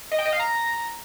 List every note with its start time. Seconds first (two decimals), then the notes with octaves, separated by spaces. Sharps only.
0.12 D#5
0.19 G5
0.26 D#5
0.33 F5
0.40 A#5